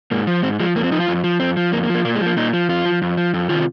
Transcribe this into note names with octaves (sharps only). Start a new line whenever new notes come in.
G#2 A#3
F3
G#2 C4
F3 G#3
F2 A#3
C4
F3 D#4
F4
F2
F3
F2 C4
F3
F2 A#3
A#3
F3
A#3
A#2 A#3
G#3
F3
A#3
A#2 D#4
F3
F2 F4
F3
F2
F3
F2
C3 D#3 F4